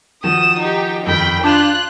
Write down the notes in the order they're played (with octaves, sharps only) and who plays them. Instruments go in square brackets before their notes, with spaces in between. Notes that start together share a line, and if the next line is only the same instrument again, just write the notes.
[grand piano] D#3 F3 F#4 [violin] D#6 E7
[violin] D#4 G4
[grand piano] F2 D#3 [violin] G5 B5
[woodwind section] D4 [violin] F4 F#6 [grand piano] D6 G6 E7